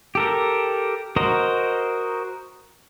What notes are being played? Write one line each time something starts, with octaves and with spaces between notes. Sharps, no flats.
G4 A4 A#4
F#4 A#4 C5 D#5